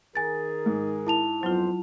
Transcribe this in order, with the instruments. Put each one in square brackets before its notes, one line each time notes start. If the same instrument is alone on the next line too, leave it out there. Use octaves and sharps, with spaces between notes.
[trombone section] D#3 G#4 A#4 [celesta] G#5 A6
[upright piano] G#2
[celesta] E4 A5 F7
[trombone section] F2 B3 C5 [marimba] F#3 F4